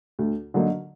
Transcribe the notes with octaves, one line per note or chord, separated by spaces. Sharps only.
D2
D3 F#3 A#3 D#4